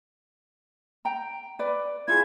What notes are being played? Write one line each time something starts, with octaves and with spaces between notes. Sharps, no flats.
G5 A#5
B4 D5
E4 F4 G#4 G#6